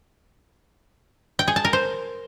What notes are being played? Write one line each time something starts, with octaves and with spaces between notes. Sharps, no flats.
G5
G#4
A5
A#4
C5